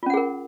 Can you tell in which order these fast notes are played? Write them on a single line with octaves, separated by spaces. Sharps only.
F4 C#4 F#5 G#4 A#4